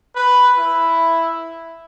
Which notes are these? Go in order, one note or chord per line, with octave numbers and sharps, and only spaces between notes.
B4
E4